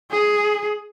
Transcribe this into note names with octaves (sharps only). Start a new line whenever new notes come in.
G#4